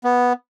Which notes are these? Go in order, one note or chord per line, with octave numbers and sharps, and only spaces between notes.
B3